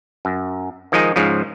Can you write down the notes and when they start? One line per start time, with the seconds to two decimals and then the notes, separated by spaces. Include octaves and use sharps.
0.25 F#2
0.92 D#3 F3 G#3 D#4 G#4
1.16 G#2 C#3 F3